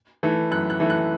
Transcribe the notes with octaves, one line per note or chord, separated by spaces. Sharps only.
E3 A3
F#2 F#6
F#6
E3 A3
F#6